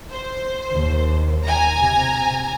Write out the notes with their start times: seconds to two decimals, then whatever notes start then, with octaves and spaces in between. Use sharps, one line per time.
0.12 C5
0.71 D#2
1.44 G#5 A#5
1.77 C3